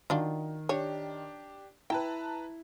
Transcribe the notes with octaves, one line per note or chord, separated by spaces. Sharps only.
D#3 F#3 D4 F4
D4 G4 C#5
E4 B4 G5 A5 A#5